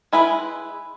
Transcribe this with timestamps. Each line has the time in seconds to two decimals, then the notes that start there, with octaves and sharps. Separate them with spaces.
0.13 G#3 E4 G#4 B4